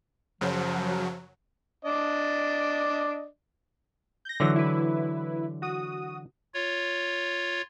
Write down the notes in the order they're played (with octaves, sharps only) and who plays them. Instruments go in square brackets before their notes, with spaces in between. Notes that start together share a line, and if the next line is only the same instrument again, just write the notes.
[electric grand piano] F#2 C#3 C5 [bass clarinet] F3 [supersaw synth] F#3
[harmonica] D4 D5 D#5
[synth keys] G6 A#6
[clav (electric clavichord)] D3 E3 F#3
[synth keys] E4 B4
F#4 D#6
[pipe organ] F4 C#5